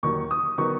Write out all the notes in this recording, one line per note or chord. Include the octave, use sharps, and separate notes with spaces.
D#2 D#3 F#3 C#6
D#6
D#3 F#3 B3 D#4 C#6